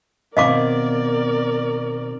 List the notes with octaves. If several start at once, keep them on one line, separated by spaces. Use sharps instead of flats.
B2 D#3 C4 A#4 D5 D#5 F5 D6